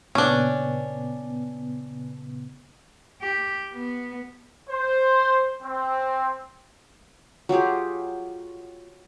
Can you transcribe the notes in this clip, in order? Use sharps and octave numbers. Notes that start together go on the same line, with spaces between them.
A#2 C#3 B3 C#4 D4
G4
B3
C5
C4
F#3 F4 G4 G#4